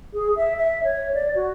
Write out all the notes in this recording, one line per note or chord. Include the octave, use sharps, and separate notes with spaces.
G#4
E5
E5
C#5
D5
F#4